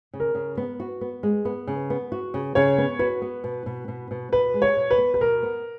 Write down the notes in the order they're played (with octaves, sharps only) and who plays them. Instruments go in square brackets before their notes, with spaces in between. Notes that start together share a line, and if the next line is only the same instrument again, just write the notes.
[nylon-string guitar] C#3
[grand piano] A#4
[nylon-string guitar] C#3
B3
F#4
B3
G#3
B3
C#3
B3
F#4
C#3
[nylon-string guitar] C#3 [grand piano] C#5
[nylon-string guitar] B3
[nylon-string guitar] F#4 [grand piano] B4
[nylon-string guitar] B3
B2
B2
B2
B2
[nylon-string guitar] B2 [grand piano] B4
[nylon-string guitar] G#3
[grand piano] C#5
[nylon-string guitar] B2
[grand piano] B4
[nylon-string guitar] B3
[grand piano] B4
[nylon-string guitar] B2 [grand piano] A#4
[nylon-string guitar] B3